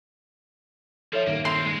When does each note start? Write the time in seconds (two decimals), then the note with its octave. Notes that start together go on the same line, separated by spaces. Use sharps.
1.13 F3 A4 C#5 E5
1.27 G2 A#2 D#3 A#3
1.45 C4 A#4 C6
1.65 G#3